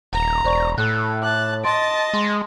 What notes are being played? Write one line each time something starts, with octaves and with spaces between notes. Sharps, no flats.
D#1 A#5
E1 C5 D5 C#6
A2 A4 F#6 E7
A5 D6 F#6
D#5 A5 C6 A6 D7
G#3 C6